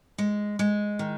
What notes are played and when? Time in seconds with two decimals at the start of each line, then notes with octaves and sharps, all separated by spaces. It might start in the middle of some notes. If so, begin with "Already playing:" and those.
0.18 G#3
0.59 G#3
0.99 D#3